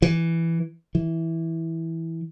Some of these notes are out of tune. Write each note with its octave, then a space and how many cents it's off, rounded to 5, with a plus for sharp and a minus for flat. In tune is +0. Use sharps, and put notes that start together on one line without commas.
E3 +5
E3 -10